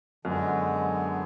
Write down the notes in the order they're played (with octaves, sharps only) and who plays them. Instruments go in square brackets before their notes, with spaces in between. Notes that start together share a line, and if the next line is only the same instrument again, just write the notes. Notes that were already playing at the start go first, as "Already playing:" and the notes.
[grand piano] F#2 [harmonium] D3 G#3 B3